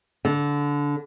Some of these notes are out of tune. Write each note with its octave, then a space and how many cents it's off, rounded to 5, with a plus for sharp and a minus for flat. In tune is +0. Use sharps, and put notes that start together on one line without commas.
D3 -20